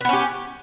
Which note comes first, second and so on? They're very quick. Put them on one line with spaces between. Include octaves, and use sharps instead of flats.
B4 B3 C#4 G4